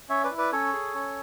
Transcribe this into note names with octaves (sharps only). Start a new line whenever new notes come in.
C#4 C#5 E5
B4 D5
E4
B4 D5
C#4 A4 C#5
G#4
C#4